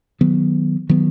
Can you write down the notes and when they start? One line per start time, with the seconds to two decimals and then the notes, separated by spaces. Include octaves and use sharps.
0.21 D#3 F#3 B3
0.89 D#3 F#3 B3